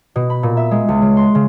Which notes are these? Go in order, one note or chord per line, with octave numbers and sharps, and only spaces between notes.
B2
B5
A#2
E5
G#3
C#2
C#3
C6
C#3